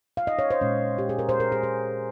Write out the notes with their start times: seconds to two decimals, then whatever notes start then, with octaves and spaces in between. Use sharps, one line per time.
0.17 F5
0.27 D#5
0.39 C#5
0.51 C5
0.61 A#2 G#3 C#4
0.98 G4
1.09 G#4
1.19 A#4
1.29 C5
1.40 A#4
1.52 G#4
1.63 G#4